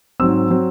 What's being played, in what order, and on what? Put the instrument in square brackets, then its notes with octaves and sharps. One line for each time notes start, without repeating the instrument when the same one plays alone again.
[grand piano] G#2 F#3 C4 E6
F#3 C4